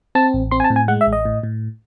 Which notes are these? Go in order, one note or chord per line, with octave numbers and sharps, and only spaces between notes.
C4 A5
A1
C4 C6
G#5
A5
A2
G#5
G#3 F#5
E5
A1
D#5
A2
A2